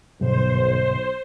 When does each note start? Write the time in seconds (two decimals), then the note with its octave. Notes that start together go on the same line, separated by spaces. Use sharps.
0.21 B1 G2 B2 D3 C5